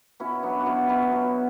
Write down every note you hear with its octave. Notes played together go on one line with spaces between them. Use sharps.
B2 C#4 E4
F#3 B3 D4
F#4
B2 C#4 E4
F#3 C#4 E4
B2